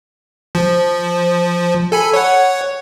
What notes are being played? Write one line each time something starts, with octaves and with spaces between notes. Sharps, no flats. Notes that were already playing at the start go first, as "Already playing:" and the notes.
F3
A4 G#5 B5
C#5 F#5